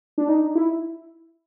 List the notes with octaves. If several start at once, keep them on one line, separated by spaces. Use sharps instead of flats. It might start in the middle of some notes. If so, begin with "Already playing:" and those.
D4
D#4
E4